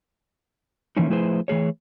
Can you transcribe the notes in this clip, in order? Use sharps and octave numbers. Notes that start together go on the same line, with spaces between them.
E3 F3 A3 A#3 C#4 D#4
F3 A3 E4 G#4 B4 C5
E3 A3 G#4 C#5